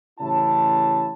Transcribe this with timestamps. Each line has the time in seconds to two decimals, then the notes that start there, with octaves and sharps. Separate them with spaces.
0.20 A1 C#3 E4 C#5 A5